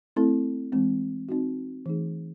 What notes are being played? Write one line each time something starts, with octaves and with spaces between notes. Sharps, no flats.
A3 C4 E4 A4
E3 G#3 C4
C4 D#4 F#4
E3 A3 D#4 G#4